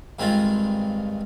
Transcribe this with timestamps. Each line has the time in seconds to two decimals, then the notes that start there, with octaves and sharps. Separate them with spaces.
0.19 G2 D#3 G#3 C4 F4